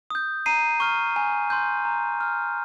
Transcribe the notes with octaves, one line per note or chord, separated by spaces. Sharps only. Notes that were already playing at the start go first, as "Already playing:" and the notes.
D#6 G6
A#5 C7 D#7
C#6 F6
G#5
C6 G6
A#5
F6